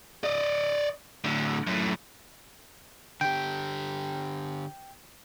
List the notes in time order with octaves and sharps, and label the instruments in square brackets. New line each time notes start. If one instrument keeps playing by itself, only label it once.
[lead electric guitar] D5 D#5
A2 D3
F#2 A2
[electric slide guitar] D3 G4 [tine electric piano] G5